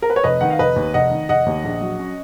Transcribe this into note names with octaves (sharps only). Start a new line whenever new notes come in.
A#4
B4
C#5
F1 B4 D#5
D#3 F#5
F5
F1 B4 D#5
D#2
F1 D#5 F#5
D#3
F1 D#5 F#5
D#2
A#1
F#3
C#4